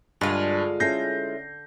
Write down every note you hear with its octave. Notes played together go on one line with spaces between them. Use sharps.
G2 D3 G#3 F4
C#4 E4 A4 G6 A#6 C7